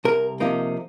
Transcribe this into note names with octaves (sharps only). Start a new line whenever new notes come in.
C2 A#4
C3 F3 A#3 D#4